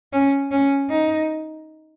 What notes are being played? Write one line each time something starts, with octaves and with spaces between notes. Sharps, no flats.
C#4
C#4
D#4